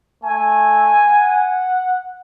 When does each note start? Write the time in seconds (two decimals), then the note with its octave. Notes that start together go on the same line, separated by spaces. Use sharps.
0.24 A3 G#5
1.08 F#5